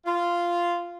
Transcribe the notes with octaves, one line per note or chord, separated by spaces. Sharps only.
F4